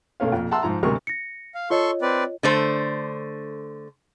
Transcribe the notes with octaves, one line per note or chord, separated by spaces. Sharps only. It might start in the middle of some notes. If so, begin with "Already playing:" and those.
B1 A3 A#3 C#4 F5
F2 A#2
E5 F#5 A5 A#5 C6 E6
G#2 F3 A#5
D2 C3 F#3 G#3 A#4 C#6
A#6 C#7
F5
F4 A4 C#5 D#5 C6 C#6
C4 B4 D5
D3 A3 C5